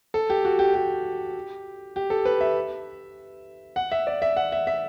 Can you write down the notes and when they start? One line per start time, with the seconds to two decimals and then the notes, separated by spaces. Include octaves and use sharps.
0.14 A4
0.30 G4
0.45 F#4
0.59 G4
0.74 G4
1.96 G4
2.10 A4
2.25 B4
2.41 E5
3.76 F#5
3.92 E5
4.07 D5
4.22 E5
4.37 F#5
4.52 E5
4.67 E5